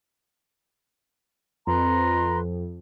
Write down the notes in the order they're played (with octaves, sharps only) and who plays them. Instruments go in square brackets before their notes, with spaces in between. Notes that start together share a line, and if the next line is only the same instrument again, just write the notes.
[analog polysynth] F2 [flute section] B4 A#5 C6